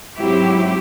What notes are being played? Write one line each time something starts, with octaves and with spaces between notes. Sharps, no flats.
G#2 F#3 C4 E4 G4